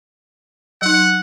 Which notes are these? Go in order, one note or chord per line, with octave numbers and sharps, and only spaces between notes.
F#3 D#4 F#5